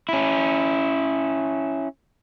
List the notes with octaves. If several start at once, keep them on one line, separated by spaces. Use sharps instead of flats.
C#4 E4